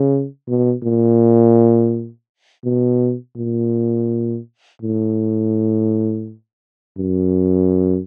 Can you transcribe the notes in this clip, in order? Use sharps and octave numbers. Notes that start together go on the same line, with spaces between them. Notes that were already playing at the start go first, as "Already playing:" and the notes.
Already playing: C#3
B2
A#2
B2
A#2
A2
F#2